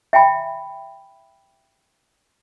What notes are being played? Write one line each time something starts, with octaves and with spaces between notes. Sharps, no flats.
E5 G5 G#5 B5